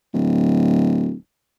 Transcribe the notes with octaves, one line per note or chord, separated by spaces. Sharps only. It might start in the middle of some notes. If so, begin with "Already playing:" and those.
D1